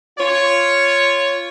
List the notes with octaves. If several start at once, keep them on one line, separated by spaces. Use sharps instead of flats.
F4 C#5